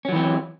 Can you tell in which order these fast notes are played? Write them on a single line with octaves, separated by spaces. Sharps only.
C#4 F#3 E3 C4